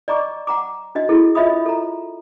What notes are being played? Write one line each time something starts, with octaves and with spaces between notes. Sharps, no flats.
D5 D#5 A#5 C#6 D6
F#5 A#5 D6
D4 F#4 D#5
E4 F#4 G#4 A4
F4 C#5 D#5 E5 B5 D#6
A4 A#5